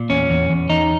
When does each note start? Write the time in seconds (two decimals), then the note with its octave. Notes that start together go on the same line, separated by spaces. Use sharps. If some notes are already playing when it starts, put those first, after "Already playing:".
Already playing: A#2
0.09 E2 C#4
0.30 E2
0.50 E2
0.70 E2 D#4